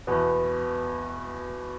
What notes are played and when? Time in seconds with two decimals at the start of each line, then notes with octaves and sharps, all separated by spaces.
0.07 E2 B2 B3